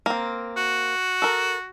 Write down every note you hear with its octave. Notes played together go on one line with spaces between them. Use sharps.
A#3 C4
F#4
A4 A#4